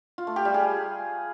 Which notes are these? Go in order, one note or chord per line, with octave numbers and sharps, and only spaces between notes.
F4
A3
G4
G3
G#4